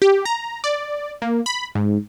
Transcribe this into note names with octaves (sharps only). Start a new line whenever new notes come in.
G4
A#5
D5
A#3
B5
G#2